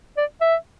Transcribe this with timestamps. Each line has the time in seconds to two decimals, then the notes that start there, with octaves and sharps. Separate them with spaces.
0.17 D5
0.41 E5